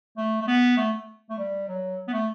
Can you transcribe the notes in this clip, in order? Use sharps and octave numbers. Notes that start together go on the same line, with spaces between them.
A3
A3
B3
A3
A3
G3
F#3
B3
A3